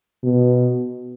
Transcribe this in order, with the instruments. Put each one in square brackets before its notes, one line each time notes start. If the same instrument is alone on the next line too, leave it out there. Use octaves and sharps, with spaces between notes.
[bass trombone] B2